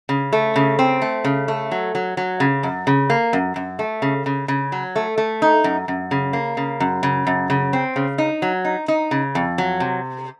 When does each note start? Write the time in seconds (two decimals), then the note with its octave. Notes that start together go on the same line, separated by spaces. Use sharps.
0.09 C#3
0.33 A3
0.56 C#3
0.79 C4
1.02 A3
1.25 C#3
1.48 A3
1.71 F#3
1.95 F#3
2.17 F#3
2.40 C#3
2.63 F#2
2.87 C#3
3.10 A#3
3.33 F#2
3.56 F#2
3.79 A3
4.02 C#3
4.26 C#3
4.48 C#3
4.72 F#3
4.96 A3
5.18 A3
5.42 D#4
5.64 F#2
5.88 F#2
6.11 C#3
6.33 A#3
6.57 C#3
6.80 F#2
7.03 C#3
7.27 F#2
7.50 C#3
7.73 C4
7.96 C#3
8.18 D#4
8.42 F#3
8.65 D#4
8.88 D#4
9.11 C#3
9.35 F2
9.58 F#3
9.80 C3